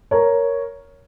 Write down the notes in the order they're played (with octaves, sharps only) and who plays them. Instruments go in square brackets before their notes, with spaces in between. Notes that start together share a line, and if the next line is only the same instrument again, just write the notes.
[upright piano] A#4 C#5